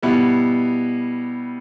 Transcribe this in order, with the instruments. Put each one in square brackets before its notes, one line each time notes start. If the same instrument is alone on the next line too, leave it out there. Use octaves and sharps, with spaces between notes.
[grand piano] B2 G3 B3 E4